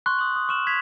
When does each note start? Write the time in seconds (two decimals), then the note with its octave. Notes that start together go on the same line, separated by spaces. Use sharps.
0.06 C6 C#6 F#6
0.19 D#6 F#7
0.36 D#6
0.49 C#6 F6 E7 F#7
0.67 G#6 B6 F7